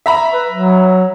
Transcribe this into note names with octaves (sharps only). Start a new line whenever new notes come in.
E5 A#5 B5
B4
F#3